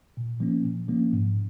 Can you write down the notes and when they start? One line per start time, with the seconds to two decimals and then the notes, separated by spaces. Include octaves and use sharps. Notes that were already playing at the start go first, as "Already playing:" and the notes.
0.17 A#2
0.40 F3 A#3 C#4
0.64 A#2
0.88 F3 A#3 C#4
1.13 G#2